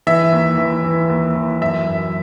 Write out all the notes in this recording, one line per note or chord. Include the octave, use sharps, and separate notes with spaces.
E3 E5
D#2
E3
E3
D#2
E3
F#2 E5
F#2